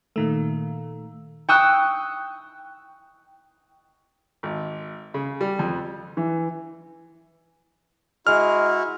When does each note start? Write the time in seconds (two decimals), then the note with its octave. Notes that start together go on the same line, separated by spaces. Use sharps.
0.16 A#2 D#3 A3
1.49 G5 C#6 D#6 E6 F#6
4.43 G#1
5.14 C#3
5.41 G3
5.59 F2
6.17 E3
8.27 G#3 E4 F#4 F6